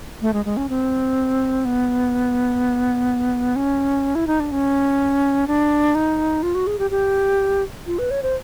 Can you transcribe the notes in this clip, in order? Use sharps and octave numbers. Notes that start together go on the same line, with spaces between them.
A3
G#3
G#3
C#4
C4
B3
C#4
E4
D#4
D4
C#4
D4
D#4
F4
F#4
G#4
G4
G4
F4
B4
C#5
C5